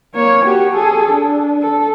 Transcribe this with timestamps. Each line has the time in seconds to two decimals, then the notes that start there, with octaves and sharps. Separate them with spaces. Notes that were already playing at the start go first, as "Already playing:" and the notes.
0.15 A#3 C#5
0.45 F#4 G4
0.75 G#4 A4
1.12 D4
1.62 A4